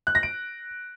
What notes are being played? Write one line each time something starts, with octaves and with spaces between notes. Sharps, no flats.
F#6
A#6
D7